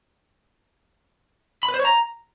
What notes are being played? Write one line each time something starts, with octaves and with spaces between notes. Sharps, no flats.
B5
B4
C5
C#5
A#5